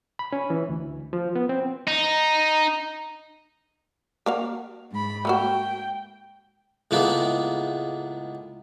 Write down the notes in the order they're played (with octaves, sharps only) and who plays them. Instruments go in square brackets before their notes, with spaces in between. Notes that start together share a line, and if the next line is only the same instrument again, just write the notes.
[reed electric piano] B5
C#4
E3
D2
F3
B3
C4
[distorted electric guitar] D#4
[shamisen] A#3 F#4 F5
[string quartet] G#2 B5
[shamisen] A3 A#3 F#4 [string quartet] G5
[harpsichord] C#2 A2 G#3 A#3 B3